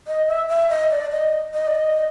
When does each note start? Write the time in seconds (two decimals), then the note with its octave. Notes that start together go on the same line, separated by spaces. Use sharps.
0.07 D#5
0.28 E5
0.49 E5
0.70 D#5
0.91 D5
1.12 D#5
1.54 D#5
1.67 D5
1.75 D#5